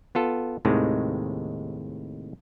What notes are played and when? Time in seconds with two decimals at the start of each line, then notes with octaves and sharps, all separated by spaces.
0.15 B3 F4 A4
0.65 D#2 A2 C3 D#3 G#3